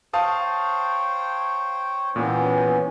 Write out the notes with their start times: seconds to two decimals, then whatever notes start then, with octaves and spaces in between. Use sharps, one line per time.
0.13 C5 C#5 F5 G5 A5 D#6
2.16 A#2 E3 G3 B3 C#4 G#4